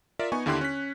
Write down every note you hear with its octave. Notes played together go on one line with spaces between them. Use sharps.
F4 A#4 D5 E5
B3 D#4 G#5 C#6
D#2 D3 E4 G4 C6 F#6
C#4 B6